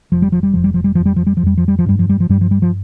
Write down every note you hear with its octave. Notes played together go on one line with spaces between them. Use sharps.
F1 F3
G3
F3
G3
F1 F3
G3
F3
G3
F2 F3
G3
F3
G3
F3
F2 G3
F3
G3
F3
G2 G3
F3
G3
F3
G2 G3
F3
G3
F3